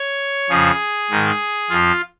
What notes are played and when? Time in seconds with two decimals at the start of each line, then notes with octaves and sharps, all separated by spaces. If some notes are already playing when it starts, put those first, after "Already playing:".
Already playing: C#5
0.49 F2 C#3 F3 G#4
1.10 G#2 D#3
1.70 F2 F3 F4